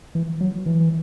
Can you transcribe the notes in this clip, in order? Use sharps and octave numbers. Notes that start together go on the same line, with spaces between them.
E3
F#3
E3